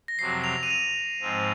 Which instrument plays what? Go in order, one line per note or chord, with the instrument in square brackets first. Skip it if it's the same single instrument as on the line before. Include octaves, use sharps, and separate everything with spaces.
[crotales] A#6
[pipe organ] F2 C3 F#3 C4 [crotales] C7
[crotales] F7
D#7
F7
[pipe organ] G#2 F3 C4